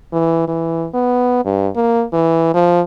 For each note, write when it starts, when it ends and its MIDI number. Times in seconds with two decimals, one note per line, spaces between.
0.13 0.43 52
0.48 0.86 52
0.94 1.44 59
1.45 1.68 43
1.76 2.04 58
2.13 2.49 52
2.54 2.81 53